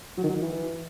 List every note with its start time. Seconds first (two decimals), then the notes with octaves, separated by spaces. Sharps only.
0.18 F#3
0.24 D#3
0.30 F#3
0.35 D#3
0.41 E3